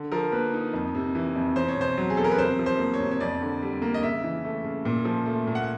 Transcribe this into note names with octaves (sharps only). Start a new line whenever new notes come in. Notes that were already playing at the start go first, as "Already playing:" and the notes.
Already playing: D3
F3 A#4
A#3 B4
D#4
F2
C3
E3
F2
E2 C5
C#5
B2 C5
F#3
G#4
E2 A4
A#4
B4
C3 C5
F3
C5
A#3
C#5
C3
C#5
F2 D5
D3
G3
A#3
D#5
C#3 E5
E3
A3
C#3
A#2
F3
A3
A#2
F#5